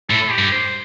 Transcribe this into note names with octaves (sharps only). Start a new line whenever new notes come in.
A2 A4
G4
G2
C5